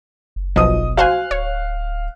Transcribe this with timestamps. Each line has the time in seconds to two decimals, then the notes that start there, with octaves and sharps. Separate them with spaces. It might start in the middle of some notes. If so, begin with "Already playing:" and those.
0.36 F#1
0.56 B1 B2 F3 D#5 D#6
0.97 F#4 C5 F5 G#5 F#6
1.31 D1 C#5